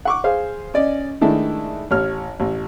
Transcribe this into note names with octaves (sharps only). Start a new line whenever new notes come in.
F#5 C#6 D6
G#4 C5 F5
C#4 D5 D#5
D#3 G#3 A3 D4 E4
A1 C#5 F6
A1